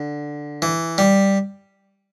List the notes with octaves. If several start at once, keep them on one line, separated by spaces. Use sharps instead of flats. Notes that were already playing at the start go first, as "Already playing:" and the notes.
Already playing: D3
E3
G3